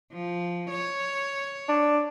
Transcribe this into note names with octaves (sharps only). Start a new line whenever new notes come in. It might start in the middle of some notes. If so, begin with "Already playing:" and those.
F3
C#5
D4